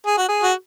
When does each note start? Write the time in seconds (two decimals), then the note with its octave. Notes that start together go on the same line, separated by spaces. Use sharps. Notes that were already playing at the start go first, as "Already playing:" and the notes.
0.06 G#4
0.18 F#4
0.29 G#4
0.43 F#4